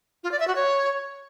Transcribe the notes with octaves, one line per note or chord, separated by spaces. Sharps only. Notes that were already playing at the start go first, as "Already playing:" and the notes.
F4
D5
E5
F#4
C#5